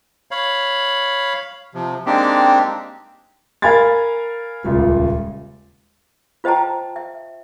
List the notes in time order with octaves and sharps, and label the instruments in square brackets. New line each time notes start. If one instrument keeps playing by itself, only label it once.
[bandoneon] C#5 F5 B5
C3 F3
G#3 A#3 C4 D4 D#4 G4
[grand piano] A#4 F5 G#5 B5 G#6 A6
D#1 C#2 F4
[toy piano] F4 C5 D#5 G5 A5 A#5
E5